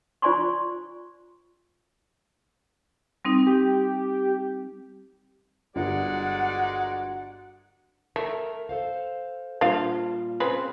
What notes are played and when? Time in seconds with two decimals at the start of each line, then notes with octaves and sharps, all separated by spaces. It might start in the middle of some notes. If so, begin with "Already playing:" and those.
0.22 F4 C5 D5 G#5 C6 C#6
3.25 G3 C4 D#4
3.47 G4
5.76 G1 G2 G#3 F#4 A#4 D5 F#5
8.16 A3 A#4 A#5
8.69 A4 C5 F5
9.61 A#2 G3 D4 F4 C5 F5
10.40 C#3 C4 B4